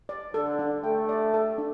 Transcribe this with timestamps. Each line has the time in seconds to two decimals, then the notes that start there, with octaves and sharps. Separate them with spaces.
0.09 D5
0.34 D3 A4
0.59 D4
0.84 A3 G5
1.09 D5
1.34 A4
1.58 D4